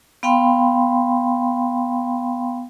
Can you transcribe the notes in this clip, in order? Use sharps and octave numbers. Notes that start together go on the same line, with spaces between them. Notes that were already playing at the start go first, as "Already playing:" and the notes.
B3 F5 G5 B5 C6